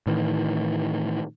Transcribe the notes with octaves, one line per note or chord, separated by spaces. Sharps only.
A2 D#3 E3